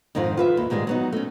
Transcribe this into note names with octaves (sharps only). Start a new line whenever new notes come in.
F2 G#2 D#3 C4 F4
F4 B4 E5
D#2
G#2 D#3 G3 G#3
F#3 B3 D#4
A3 C#4